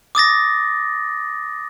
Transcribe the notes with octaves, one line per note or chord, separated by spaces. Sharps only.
D6 D#6 A6 A#6